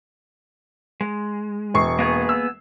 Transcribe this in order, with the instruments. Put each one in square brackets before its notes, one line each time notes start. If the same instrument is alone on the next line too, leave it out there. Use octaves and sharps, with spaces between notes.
[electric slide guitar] G#3
[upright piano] E1 C#6 C7
[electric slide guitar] A#3 B3 G#4
[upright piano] E6